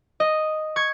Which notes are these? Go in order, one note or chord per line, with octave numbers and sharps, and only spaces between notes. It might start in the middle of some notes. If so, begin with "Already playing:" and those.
D#5
C#6 G#6